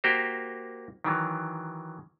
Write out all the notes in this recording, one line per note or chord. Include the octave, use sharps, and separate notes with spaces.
A#3 F#4 G4 A#4 C5
D#3 E3 F#3